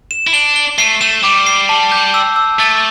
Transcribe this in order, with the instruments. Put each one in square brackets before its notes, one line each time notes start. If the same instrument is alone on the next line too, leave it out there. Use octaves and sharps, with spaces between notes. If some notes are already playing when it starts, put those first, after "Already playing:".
[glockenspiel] E7
[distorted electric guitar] E4
[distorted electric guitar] D4 [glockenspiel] G7
[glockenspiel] G7
[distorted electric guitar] A3 [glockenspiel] C7
[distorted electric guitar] A3 [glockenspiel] E7
[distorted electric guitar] G3 [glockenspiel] D6
[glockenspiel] C7
A5
G6
E6
E6
[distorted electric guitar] A3 [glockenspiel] A6